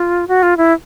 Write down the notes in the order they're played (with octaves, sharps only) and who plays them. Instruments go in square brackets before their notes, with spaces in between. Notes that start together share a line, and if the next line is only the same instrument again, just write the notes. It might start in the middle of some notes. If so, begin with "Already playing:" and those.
Already playing: [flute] F4
F#4
F4
E4